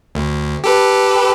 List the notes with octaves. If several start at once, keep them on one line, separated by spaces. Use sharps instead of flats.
D2
G4 A4 B4